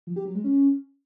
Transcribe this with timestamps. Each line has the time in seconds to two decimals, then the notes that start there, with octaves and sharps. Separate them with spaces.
0.07 F3
0.16 G4
0.25 F#3
0.35 G#3
0.44 C#4